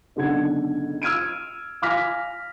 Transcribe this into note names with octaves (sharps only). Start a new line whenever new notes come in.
F#1 B1 D3 F#5 G#6
E6 F6 G#6 D7 D#7
F5 G#5 D6 F6 A#6 B6